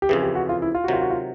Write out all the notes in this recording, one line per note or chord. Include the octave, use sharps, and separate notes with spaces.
G4
F2 C#3 E3 G#4
G4
F#4
F4
E4
F4
F#4
C3 D#3 F#3 F4
F#4
F4